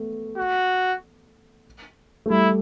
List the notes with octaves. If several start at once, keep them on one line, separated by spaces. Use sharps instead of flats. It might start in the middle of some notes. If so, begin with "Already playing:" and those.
Already playing: A3 B3
F#4
A3
G3 E4